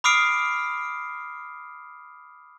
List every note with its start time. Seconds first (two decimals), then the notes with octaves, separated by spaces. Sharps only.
0.04 B5 D6 D#6 F6 C7 D7